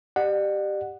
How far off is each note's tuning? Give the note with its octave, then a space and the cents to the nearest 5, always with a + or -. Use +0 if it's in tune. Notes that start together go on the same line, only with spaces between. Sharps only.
G4 +0 D5 +40 F#5 +0